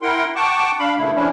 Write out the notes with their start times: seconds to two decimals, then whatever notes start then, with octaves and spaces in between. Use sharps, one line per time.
0.02 E4 A#4 F#5 G5 C6
0.36 F#5 G5 A5 C#6 D6
0.79 D4 F5 B5
0.97 G2 A#2 C#3 A3 E4
1.15 F3 C#4 D4 E4